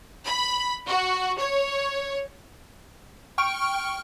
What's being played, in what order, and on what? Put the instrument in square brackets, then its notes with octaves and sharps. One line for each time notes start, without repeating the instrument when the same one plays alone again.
[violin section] B5
F#4
C#5
[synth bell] G5 C#6 F6 D7